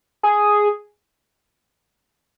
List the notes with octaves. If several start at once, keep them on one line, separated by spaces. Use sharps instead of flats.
G#4